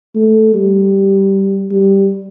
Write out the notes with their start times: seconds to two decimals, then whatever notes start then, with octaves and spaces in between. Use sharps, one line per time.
0.15 A3
0.55 G3
1.71 G3